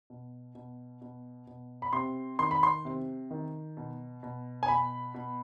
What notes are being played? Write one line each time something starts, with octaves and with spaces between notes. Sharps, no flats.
B2
B2
B2
B2
B5
C3 C6
D#3 C6
B5
C6
C3
D#3
B2
B2
G#5
B2 B5
B2